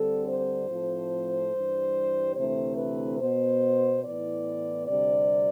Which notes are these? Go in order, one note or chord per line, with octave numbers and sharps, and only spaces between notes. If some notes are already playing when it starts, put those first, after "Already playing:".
Already playing: D2 D3 G3 C4 A4
C5
A2 F3 A3 C4
G2 E3 G3
D2 C3 E3 A3 C4 C5
B4
B2 B3 C5
A2 E3 B3 D5
D2 C3 G3 C4 D5